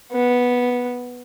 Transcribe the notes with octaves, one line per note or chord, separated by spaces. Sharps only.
B3